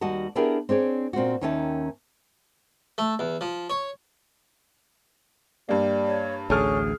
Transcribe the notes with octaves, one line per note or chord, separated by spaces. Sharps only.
D#2 G3 F#4 D#5 F#5 A5
B3 D4 E4 G4 G#4 A#4
C4 D4 G#4 C#5
A#2 C4 F4 F#4
D#2 D#3 C#4 E5 G#5 A5
A3
E2
F3
C#5
G2 G3 A#3
C#5
A1 D2 C#4 G#4 A4 F6